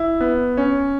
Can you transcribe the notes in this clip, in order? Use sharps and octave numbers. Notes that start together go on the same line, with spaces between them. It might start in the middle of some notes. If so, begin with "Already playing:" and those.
Already playing: E4
B3
C#4